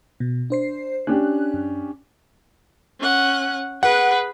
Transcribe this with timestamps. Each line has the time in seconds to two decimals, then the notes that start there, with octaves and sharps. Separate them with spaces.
0.20 B2
0.50 D4 C5 C7
1.07 C#4 D4 G4 F#6
1.54 F#2
3.00 C#4 F#5
3.83 G#4 B4 F#5